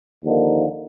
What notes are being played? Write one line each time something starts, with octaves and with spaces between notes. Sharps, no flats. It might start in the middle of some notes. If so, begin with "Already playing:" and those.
D#2 D3 F3 A#3 D#4